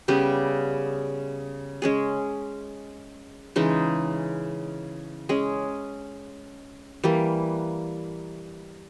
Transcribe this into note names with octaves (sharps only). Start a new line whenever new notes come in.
C#3 G3 B3 G4
G#3 C#4 G#4
C#3 E3 G#3 D#4
G#3 C#4 G#4
E3 G3 A#3